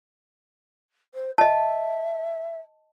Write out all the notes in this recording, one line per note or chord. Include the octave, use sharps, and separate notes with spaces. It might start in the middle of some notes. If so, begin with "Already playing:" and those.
C5
D#5 E5 A5